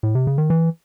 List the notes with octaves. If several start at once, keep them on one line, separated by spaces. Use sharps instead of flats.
A2
C3
C#3
D#3
E3